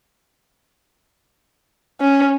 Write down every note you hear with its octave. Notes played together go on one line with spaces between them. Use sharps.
C#4